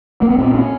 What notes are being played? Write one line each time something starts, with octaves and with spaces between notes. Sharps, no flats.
A#3
B3
A#2 C4
C#4